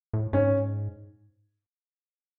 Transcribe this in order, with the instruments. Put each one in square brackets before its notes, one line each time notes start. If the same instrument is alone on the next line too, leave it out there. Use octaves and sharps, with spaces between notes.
[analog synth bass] A2
[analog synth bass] G#2 [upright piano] C#4